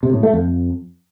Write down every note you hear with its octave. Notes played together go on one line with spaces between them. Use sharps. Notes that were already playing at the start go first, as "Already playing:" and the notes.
C3
A2
A3
F2